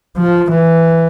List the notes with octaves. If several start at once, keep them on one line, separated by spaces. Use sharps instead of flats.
F3
E3